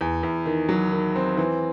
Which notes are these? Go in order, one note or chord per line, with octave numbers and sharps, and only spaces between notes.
E2
E2
D#3
F#3
D#3
C4
E3